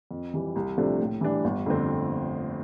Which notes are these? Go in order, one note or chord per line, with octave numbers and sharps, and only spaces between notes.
F2
E3 G3
C2
C3 F3 A3 D4
A2
E3 G3 D4
G1
F2 D3 A3 C4